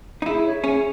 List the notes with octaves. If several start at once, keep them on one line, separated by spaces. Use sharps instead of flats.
D#4
E4 G#4
C#5 E5
C#4 G#4